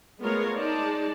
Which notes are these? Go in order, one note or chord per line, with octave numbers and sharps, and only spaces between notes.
G#3 A3 B3 F4 A#4 C#5
G#3 D#4 D5 A5